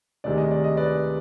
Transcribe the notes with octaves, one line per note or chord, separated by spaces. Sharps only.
D2 C3 D#3 G#3 D5
D#5
D5
D#5
B4 D5